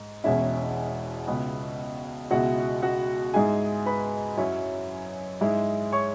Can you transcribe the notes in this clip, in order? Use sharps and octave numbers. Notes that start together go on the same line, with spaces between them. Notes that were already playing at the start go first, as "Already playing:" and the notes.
Already playing: G#2
E1 E2 B2 G#3 C#4 E4 E5
C#2 B2 B3
C#2 B2 G#3 E4 F#4 F#5
F#4 F#5
G#2 G#3 E4 G#4 G#5
B4 B5
F#2 F#3 C#4 E4 C#5
G#2 G#3 E4
C#5 C#6